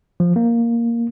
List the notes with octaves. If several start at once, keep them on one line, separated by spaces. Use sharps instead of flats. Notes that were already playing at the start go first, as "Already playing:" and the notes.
F3
A#3